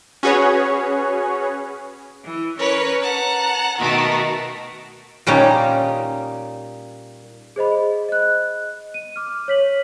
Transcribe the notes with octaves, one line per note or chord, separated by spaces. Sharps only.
C#4 F#4 G#4 B4 C#5
E3
C#4 A#4 B4 C#5
F#5 A5 A#5
B2 D#3 A3 B3 F#4 A#4
A#2 G3 C#4 D#4
G#4 C5 D#5 B5
D#5 F#6
D#7
D6 F6
C#5 B6 F#7